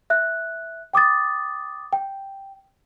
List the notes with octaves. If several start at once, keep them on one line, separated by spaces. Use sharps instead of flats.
E5 F#6
G5 D6 D#6 A6
G5